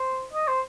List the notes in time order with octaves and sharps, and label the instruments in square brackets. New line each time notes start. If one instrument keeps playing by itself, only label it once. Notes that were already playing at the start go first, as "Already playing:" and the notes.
Already playing: [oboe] C5
D#5
C5